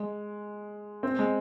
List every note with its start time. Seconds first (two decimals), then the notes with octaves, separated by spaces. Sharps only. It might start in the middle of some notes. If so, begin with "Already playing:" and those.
Already playing: G#3
1.03 C4
1.19 G#3